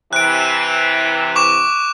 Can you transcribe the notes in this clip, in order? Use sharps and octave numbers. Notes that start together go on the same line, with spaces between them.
C3 E3 F#6 D7
C#6 D6 E7